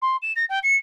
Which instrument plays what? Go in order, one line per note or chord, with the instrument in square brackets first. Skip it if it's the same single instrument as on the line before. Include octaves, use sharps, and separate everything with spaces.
[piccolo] C6
E7
A#6
G5
C#7